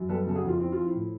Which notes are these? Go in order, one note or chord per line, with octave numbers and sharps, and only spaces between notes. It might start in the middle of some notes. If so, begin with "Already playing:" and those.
Already playing: F#2
G3 A4 B4
C#3 A4
F#4 G#4
F2 F4
C4 E4
F4
F3
E4
A2